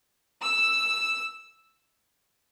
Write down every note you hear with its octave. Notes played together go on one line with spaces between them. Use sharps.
E6